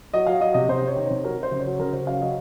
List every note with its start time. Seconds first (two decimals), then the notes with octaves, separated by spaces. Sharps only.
0.14 F#3 D#5
0.26 F#3 F5
0.40 F#3 D#5
0.54 C3 D#5
0.68 C3 C5
0.82 C3
0.87 C#5
0.96 D#3
1.06 C3 C5
1.24 F#3 A#4
1.37 F#3
1.43 C5
1.51 C#3
1.61 C#5
1.66 F#3
1.79 C#3 A#4
1.93 C#3 C5
2.07 F#3 F5
2.22 F#3 D#5